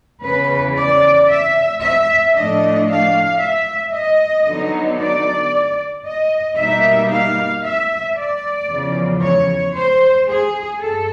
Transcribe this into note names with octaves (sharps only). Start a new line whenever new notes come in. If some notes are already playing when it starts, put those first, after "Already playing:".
E2 C#3 E3 B4
D5
E5
E5
A2 F3 A3 D4 D#5
F5
E5
D#5
D3 F#3 B3 D#4
D5
D#5
B2 G3 A#3 D#4 E5
F5
E5
D5
E2 C#3 F3
C#5
C5
G#4
G2 A4